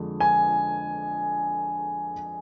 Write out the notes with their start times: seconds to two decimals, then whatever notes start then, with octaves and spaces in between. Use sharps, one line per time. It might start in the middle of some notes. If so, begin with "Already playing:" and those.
Already playing: F2 D3 G#3 D4
0.20 G#5